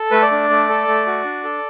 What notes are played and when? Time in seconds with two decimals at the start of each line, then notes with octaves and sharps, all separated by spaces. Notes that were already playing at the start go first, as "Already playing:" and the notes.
Already playing: A4
0.11 A3 B4
0.22 D5
0.31 D4
0.50 A3
0.69 A4
0.88 A3
1.06 F#4
1.24 D4
1.44 A4